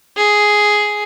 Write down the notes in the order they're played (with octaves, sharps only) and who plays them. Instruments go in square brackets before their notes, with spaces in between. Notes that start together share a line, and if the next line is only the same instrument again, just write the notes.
[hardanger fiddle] G#4